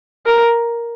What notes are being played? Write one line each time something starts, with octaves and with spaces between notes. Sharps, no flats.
A#4